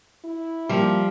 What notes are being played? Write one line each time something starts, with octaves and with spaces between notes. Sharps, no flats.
E4
F3 G3 A#3